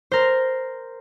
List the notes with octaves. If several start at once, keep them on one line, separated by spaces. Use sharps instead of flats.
A#4 C5